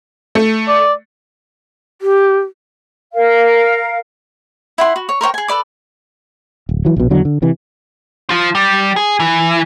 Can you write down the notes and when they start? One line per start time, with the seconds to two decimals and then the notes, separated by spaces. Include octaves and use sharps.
0.35 A3
0.68 D5
2.02 G4
3.14 A#4 F5
4.78 E4 F#5 C6
4.96 F#4
5.09 C#5
5.21 A#4 C5 C#5 G5
5.34 G#4 G#5
5.48 A4 B4 D5 D6
6.69 D1
6.85 E3 F#3
6.96 A#1 B2
7.10 E2 D3 F#3
7.25 D3
7.42 C3 E3
8.30 F3 F4
8.55 G3
8.96 G#4
9.20 E3